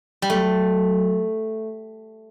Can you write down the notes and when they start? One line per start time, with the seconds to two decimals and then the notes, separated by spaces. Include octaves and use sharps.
0.22 G3
0.30 F#3 A3